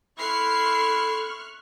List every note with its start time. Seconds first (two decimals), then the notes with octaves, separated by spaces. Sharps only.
0.18 E4 A4 C6 C#6 F6 F#6 C7